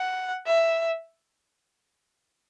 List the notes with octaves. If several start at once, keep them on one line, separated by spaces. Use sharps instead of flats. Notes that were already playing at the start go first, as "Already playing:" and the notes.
Already playing: F#5
E5